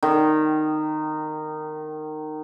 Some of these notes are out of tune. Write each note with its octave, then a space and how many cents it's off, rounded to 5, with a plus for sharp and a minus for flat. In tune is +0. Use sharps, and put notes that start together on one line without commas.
D#3 -15